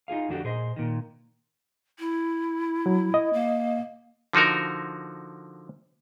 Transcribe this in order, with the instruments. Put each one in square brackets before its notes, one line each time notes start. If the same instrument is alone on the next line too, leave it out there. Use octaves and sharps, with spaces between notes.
[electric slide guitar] D#4 F4 G#4 F5
F2 D3 D4 F#4 G4 A4
A#2 G#4 C5 D#5
A#2 D#3
[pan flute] E4
[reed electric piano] F#3
D#5
[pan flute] A#3
[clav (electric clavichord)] D3 F3 D#4 F#4 A#4